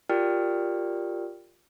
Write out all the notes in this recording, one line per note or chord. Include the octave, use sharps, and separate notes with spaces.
F4 G4 A#4 D5 G5 F6